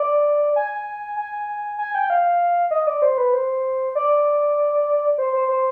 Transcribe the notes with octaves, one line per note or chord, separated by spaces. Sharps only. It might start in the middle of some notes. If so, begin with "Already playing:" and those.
Already playing: D5
G#5
G#5
G#5
G5
F5
D#5
D5
C5
B4
C5
D5
C5
C5
C5